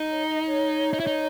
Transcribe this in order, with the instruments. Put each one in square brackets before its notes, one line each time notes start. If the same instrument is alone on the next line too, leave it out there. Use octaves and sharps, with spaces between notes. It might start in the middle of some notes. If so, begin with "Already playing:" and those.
Already playing: [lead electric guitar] D#4
[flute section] C#5
D#5
C#5
[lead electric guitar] D#4
E4
D#4